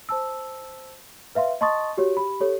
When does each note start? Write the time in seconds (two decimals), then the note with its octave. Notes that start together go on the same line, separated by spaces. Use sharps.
0.09 C5 A5 E6
1.35 B4 E5 F5 C6
1.61 D#5 A5 C6 C#6 D#6 A6
1.97 F#4 G4 C#5
2.17 G4 B5
2.40 G4 A4 C#5